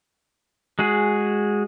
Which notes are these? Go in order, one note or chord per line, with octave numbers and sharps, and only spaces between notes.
G#3 F#4 G#4